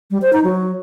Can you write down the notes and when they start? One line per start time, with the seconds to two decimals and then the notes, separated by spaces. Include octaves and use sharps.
0.11 G3
0.22 C5
0.33 D#4
0.44 F#3